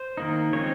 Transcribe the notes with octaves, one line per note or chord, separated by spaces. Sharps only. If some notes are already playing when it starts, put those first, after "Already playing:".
Already playing: C5
D#3 A#3 D#4
C#3 F3 G#3 C4 D#4 C#5